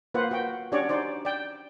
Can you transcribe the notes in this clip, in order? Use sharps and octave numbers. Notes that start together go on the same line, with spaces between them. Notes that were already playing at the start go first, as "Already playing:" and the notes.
A#3 F4 B4 C5 F#5
F#4 G5
C#4 D4 F#4 G4 C#5 D5
D#4 C5 D5
D5 G5